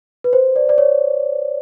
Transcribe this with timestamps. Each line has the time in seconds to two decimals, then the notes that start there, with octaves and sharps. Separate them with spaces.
0.24 B4
0.33 C5
0.56 D5
0.69 D5
0.78 C#5